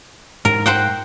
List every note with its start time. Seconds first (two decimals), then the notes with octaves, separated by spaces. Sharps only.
0.45 G#2 A#4
0.66 C5 F#5 G5